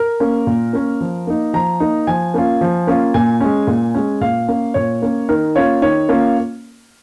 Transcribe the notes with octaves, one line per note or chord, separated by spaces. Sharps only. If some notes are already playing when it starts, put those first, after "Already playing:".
Already playing: A#4
A#3 C#4
A#2
A#3 C#4
F3
A#3 D#4
F3 A#5
A#3 D#4
F3 G#5
A#3 C#4 F4
F3
A#3 C#4 F4
A#2 G#5
G#3 C#4
A#2
G#3 C#4
A#2 F5
A#3 C#4
A#2 C#5
A#3 C#4
D#3 A#4
A#3 C#4 F4 C#5
D#3 C#5
A#3 C#4 F4